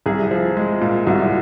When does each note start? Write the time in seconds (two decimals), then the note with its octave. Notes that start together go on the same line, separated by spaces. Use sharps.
0.06 C2 G#4
0.31 F3
0.57 G#3
0.81 A#2
1.07 C2 F#4